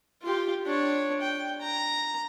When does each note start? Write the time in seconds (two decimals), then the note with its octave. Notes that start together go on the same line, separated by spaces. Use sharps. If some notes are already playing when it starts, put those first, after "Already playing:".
0.22 F4 G4
0.66 D4 C#5
1.21 G5
1.61 A#5